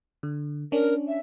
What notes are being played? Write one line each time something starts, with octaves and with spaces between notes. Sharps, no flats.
D3
C#4 D4 A#4
E5